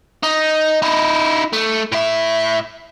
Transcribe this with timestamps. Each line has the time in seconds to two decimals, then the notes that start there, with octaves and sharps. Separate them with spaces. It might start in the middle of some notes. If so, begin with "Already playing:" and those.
0.23 D#4
0.82 D#4 E4
1.53 A3
1.92 A2 E5